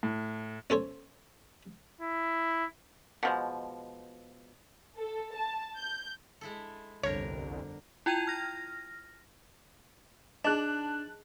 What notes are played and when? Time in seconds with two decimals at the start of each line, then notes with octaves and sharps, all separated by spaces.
0.03 A2
0.70 C#4 A4 C5 C#5
2.01 E4
3.23 B2 F3 G#3
4.96 A4
5.34 A5
5.77 G6
6.41 G#3 E4 A4
7.03 G1 C2 F2 D3 A#4 C#5
8.06 E4 F4 G5 G#6 D#7 F7
8.27 F6 A#6
10.45 D4 D#4 G#4 D#5 A5 F#6